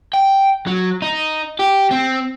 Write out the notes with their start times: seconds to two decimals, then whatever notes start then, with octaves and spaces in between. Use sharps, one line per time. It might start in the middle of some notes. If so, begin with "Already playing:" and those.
0.14 G5
0.67 F#3
1.02 D#4
1.59 G4
1.91 C4